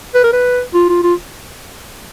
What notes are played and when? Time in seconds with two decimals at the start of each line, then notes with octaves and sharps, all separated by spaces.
0.15 B4
0.24 A#4
0.33 B4
0.74 F4
0.89 F4
1.03 F4